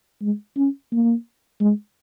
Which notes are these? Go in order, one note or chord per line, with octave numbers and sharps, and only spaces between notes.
G#3
C#4
A#3
G#3